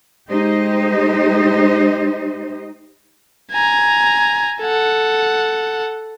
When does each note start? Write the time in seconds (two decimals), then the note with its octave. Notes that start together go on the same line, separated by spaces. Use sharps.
0.29 G#3 D#4 G4 C5 D#5
3.52 G#5 A#5
4.61 A4 F#5